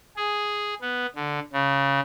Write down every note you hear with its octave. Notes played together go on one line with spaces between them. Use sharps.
G#4
B3
D3
C#3